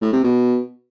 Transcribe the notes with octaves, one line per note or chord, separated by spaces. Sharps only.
A2
C3
B2